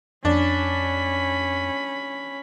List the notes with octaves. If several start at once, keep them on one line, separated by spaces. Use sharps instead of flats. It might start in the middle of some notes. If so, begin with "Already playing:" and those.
F2 C#4 D4 B5